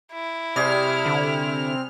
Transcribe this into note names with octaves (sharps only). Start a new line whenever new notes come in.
E4
C3 G3 G#4 F6
D3